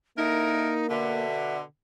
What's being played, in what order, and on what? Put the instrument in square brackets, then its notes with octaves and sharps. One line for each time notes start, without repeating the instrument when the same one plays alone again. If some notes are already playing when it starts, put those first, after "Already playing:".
[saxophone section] D3 E4 A#4 [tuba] A#3 [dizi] D#4
[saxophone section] B2 D3 [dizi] E5